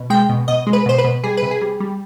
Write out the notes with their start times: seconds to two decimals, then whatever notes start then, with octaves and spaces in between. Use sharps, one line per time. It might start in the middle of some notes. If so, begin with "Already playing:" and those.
Already playing: B2
0.10 G#3 G5
0.29 B2
0.48 B2 D#5
0.67 G#3
0.73 B4
0.86 B2 C5
0.98 B4
1.04 B2
1.23 G3 G#4
1.37 B4
1.42 C3
1.51 G#4
1.61 G3
1.80 G3